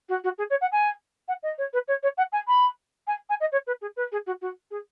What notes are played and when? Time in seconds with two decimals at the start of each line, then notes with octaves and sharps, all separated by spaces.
0.08 F#4
0.23 F#4
0.38 G#4
0.49 C#5
0.61 F#5
0.71 G#5
1.27 F#5
1.42 D#5
1.58 C#5
1.73 B4
1.87 C#5
2.02 C#5
2.17 F#5
2.32 G#5
2.47 B5
3.07 G#5
3.29 G#5
3.40 D#5
3.51 C#5
3.66 B4
3.81 G#4
3.96 B4
4.11 G#4
4.26 F#4
4.41 F#4
4.70 G#4